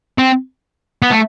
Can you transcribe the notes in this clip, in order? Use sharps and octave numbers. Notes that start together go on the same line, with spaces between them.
C4
B3
A3